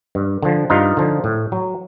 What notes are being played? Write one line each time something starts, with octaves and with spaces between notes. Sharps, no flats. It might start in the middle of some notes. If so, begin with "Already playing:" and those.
G2
D3 F3
G2 D#4 F4
D3 F3
A2
F#3